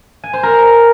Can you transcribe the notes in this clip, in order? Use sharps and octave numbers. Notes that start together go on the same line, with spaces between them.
G#5
C5
A#4